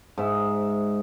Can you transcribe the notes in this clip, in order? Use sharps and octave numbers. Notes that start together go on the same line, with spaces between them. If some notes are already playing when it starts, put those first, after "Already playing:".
G#2 E5